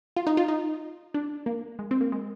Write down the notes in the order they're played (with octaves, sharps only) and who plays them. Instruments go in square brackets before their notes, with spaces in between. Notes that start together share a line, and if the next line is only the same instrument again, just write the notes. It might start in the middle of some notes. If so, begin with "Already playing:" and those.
[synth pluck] F4
D#4
F4
D#4
D4
A#3
G#3
C4
A#3
G#3